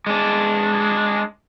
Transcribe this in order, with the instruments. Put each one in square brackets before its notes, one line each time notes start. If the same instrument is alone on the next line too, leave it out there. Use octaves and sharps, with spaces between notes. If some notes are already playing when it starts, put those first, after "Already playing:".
[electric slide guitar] G#3 D4